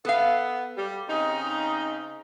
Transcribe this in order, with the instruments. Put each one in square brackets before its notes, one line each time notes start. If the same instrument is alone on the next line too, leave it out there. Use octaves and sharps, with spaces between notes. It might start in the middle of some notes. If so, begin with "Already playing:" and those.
[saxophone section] B3 [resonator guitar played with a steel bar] A4 F5
[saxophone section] G3
C#3 C4 D#4